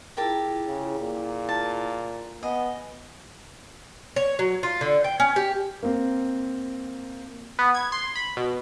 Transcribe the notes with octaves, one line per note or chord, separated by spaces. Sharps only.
E4 F4 G4 G#4 A#4 A5
C#3
A#2
A5
B3 D#5 G#5
C#5
F#3
F4
D3
G5
C#4
G4
A#3 C4
B3
G#6
C6
B5
B2